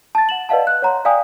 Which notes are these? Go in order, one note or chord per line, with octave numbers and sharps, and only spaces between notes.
A5 A6
F#5 E7 F#7
B4 D5 D#5 F5 F#5 A5
F#6
C#5 F#5 A#5 C6
D5 F5 G5 G#5 D#6